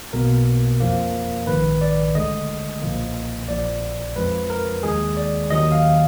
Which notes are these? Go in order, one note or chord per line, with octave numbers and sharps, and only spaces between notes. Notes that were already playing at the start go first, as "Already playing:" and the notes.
B1 B2 A#3 A#4
F2 F3 A#3
A#1 G#2 D#3 B4
D5
D2 D3 G#3 D#5
B1 A#2 F3 A#3
A#1 A#2 F3 D5
F2 F3 G#3 B4
A#4
D#2 D#3 G#3 G#4
D5
D#2 D#3 F#3 D#5
F5